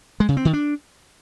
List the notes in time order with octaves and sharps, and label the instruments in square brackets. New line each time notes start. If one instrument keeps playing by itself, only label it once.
[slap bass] G#3
C#3
C4
D#3
D4